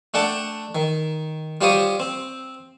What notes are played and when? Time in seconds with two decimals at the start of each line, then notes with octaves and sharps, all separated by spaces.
0.14 A3 D4 F#5 G5 A5
0.75 D#3
1.61 G3 F4 G4 C5 C#5 D#6
2.00 C4